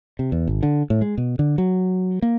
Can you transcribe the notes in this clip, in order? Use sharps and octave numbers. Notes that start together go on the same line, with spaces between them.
C3
E2
G#1
D3
A2
G#3
B2
D3
F#3
A#3